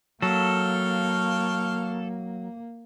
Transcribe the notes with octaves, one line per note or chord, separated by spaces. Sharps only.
F#3 A#3 A4 F5 G5 C#6